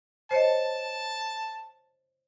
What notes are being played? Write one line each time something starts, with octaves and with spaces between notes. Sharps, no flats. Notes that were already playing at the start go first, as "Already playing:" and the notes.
C5 C#5 D#5 A5